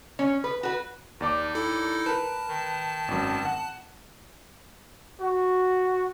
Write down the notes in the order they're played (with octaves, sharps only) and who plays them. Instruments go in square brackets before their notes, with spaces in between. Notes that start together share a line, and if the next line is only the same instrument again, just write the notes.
[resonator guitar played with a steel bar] C#4
B4
F#4 B4
[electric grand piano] D#2 D5 D6 [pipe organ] D#4
[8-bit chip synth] E4 A4
[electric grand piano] A#4 B4 [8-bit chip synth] A5
[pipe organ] D#3
[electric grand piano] G#1 F#2
F#5
[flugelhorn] F#4